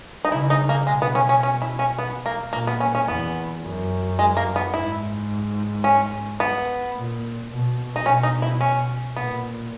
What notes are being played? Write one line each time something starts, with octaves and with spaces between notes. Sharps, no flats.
D#4
C#3 E4
D#4
A#3
B2 G#3
B3
C#4
C#4
C#4
E4
C#4
B3
A#3
A#2 A#3
B3
C#4
C#4
E2 B3
F#2
G#3
A#3
B3
G#2 E4
C#4
B3
A#2
B2
D#4
B2 C#4
D#4
E4
C#4
A#2 B3